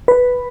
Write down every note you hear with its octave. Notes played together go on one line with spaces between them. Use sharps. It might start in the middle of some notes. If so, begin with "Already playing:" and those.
B4